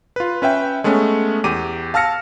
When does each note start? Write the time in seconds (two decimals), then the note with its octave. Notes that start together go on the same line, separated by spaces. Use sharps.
0.16 F4 B4
0.42 C#4 B4 E5 G5
0.84 G#3 A3 B3 C#4
1.44 E2 G4 D6 D#7
1.94 F5 A5 E6 F6 A#6 C#7